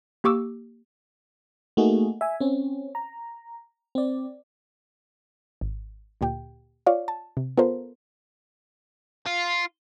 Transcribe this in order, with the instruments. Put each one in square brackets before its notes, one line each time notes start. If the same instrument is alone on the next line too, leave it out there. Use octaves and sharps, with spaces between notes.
[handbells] A#3 G4 C#6 D6 E6
[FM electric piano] A3 A#3 D#4 F#4 G#4
E5 G#5
C4 C#4
A#5
C4 D5
[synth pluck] G#1
D2 A#2 G4 G5
F4 C#5 D5 F5
A5
C3
B3 F4 A4 A#4 C5
[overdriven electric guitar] F4